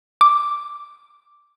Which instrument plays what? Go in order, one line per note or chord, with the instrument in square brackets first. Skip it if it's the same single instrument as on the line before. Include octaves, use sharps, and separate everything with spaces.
[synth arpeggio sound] D6